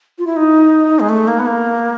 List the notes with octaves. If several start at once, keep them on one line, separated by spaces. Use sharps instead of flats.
F4
E4
D#4
G#3
A3
A#3
B3
A#3